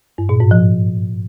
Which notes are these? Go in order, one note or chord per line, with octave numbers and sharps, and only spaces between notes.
G2
A#2
G#2
F3